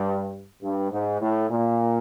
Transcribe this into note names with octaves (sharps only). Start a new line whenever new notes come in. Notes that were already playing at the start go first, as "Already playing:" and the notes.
Already playing: G2
G2
G#2
A2
A#2